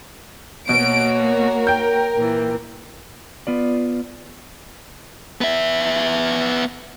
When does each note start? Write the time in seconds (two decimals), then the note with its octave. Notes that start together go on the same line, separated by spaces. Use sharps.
0.69 B2 A#3 F#4 C#5 D7
1.21 A#4
1.67 G5 G6
2.17 A#2 E3
3.47 B3 F4 D5
5.41 B3 E5